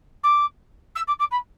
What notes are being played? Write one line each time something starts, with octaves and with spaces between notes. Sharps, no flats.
D6
E6
D6
D6
B5